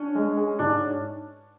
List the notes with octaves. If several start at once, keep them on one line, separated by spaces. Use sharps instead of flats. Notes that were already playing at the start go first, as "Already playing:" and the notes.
Already playing: C#4 D4
G#3
G#4
G#2 D4